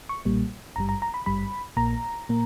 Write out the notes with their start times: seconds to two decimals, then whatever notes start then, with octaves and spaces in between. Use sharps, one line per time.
0.09 C#6
0.25 B1 A#2 G3 A#3
0.76 G#1 G2 G3 A#5
0.89 A#5
1.02 A#5
1.14 B5
1.26 G#1 G2 G3 B5
1.77 A#1 A#2 A#3 A#5
2.29 A#2 A#3